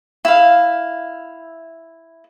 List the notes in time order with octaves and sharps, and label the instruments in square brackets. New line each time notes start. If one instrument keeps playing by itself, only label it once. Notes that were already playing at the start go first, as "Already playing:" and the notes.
[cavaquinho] E4 F5